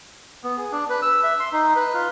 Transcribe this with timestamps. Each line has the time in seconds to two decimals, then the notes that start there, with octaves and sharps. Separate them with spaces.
0.44 B3
0.58 G#4
0.72 D4
0.90 B4
1.02 E6
1.23 E5
1.40 C6
1.53 D#4
1.76 B4
1.94 F4